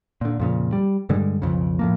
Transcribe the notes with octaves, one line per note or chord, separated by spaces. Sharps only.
A#2 D3
F2 A#2 C#3
G3
G2 D3 G3 G#3
B1 F2 C#3
A2 F3 A#3